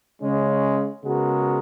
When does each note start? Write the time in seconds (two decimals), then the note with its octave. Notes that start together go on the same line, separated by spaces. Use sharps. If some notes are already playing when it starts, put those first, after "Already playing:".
0.22 C#3 G#3 C#4
1.04 C#3 G#3 B3 F#4 A#4